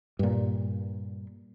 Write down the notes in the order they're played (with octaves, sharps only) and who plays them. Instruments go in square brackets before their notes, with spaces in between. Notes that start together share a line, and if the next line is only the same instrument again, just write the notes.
[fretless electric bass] G2 A#2